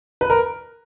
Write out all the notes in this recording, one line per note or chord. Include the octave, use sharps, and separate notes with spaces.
B4
A#4